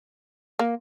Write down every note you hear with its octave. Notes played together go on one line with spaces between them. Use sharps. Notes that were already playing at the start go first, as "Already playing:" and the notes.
A#3